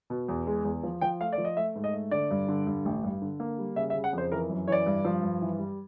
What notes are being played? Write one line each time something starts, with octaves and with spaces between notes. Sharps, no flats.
B2
E2
G#3
E2
F3
F3 G5
A3 F5
D5
F3
D#5
A3 E5
G#2
D#5
A3
D3 D5
G2
D3
G2
A1
G2
D3
A#3
G3
C#3 E5
E5
C#3
F#5
F2 C5
E3 A#4
F#2
E3 C#5 D5
G2
F3
G2
E3
G3